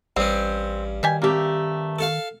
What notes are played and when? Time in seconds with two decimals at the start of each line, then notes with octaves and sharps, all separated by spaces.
0.16 A1 G2 C4 C#4
1.03 B2 D#3 G4 G#5
1.22 A3 A#3 C4 G4 A#5
1.99 A4 F5